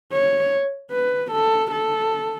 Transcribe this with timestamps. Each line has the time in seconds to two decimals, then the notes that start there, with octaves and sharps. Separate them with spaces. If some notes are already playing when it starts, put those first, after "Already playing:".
0.12 C#5
0.91 B4
1.32 A4
1.71 A4